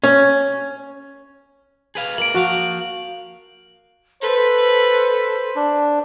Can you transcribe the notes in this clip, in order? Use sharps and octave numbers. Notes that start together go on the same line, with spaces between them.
C#4
G#4 B4 F5
A#3 D7 F#7
F3 F#4 F5
A4 B4 C5
D4